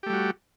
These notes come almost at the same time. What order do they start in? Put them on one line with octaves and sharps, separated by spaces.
G4 A3 G3 F#4